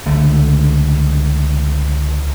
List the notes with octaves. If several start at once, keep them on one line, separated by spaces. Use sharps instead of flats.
C#2 D3 A3